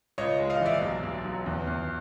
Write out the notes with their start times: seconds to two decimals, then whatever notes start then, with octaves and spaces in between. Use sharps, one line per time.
0.18 C#2 C#5 D#5
0.39 G#3
0.50 D#5 F5
0.60 E3
0.66 D5 E5
0.82 B1
1.03 B1
1.25 F#3
1.46 E2
1.67 E2